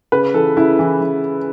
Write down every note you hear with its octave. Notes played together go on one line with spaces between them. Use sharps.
C#3 B4
E3 A4
C#3 E4
E3
E3